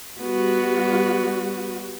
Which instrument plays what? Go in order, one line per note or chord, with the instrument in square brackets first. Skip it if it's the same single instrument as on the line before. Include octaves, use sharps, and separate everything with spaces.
[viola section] G3 F#4 [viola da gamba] B3